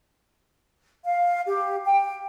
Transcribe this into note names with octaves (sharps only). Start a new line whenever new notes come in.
F5
G4
G5